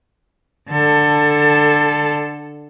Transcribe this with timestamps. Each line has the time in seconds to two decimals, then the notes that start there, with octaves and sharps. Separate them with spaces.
0.69 D3 A4